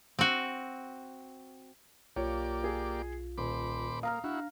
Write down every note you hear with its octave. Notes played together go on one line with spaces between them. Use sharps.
C4 F#4
B1 A#3 F4 G4 C#5 D5
G#4
D#1 C5 B5 D6
A#3 F5 A#5 D#6 F6
D4 E4 F#4